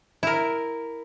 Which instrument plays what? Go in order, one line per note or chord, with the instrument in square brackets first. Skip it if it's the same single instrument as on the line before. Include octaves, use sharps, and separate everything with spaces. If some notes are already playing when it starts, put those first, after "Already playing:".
[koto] E4 A#4